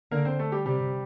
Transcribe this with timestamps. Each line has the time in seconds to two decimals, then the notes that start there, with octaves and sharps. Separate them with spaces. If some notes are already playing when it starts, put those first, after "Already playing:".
0.11 D3 A#3 A#4
0.25 C4 C5
0.39 A3 A4
0.52 G3 G4
0.66 C3 G3 G4